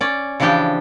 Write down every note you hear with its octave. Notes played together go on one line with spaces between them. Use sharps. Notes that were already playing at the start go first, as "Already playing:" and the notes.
C#4 D5
C#3 E3 F3 D4 G4 G5